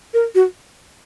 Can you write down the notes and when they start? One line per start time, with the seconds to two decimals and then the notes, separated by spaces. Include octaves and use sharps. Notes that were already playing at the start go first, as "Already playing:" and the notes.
0.14 A#4
0.35 F#4